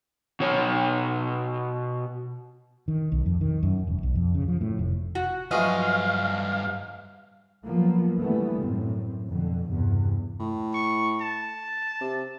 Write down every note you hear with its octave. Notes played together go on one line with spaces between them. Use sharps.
B2 C#5
D#3
B1
F2
D#3
F#2
E1
B1
F2
C#3
F3
A2
F1
F#4
G2 F3 F#3 A3 B4 D#5 F5 G#5
F3 F#3 A#3 B3
D3 E3 G3 A3 B3
F#2 A2 C4
F2 B2 D3
E2 G2 C3
A2
C#6
A5
C3